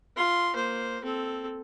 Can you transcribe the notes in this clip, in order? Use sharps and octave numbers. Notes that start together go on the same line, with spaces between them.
F4 C6
A#3 C5
C4 A4